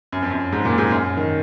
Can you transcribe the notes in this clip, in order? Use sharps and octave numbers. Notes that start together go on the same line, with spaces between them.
F#2
F2
F#2
G#2
A#2
G#2
F#2
D#3